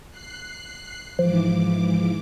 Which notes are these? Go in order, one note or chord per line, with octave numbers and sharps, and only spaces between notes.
F#6 C7
G#2 E3 F3 D6